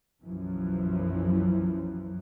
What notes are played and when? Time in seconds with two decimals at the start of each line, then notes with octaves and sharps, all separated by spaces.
0.23 B1 F#2 E3 F3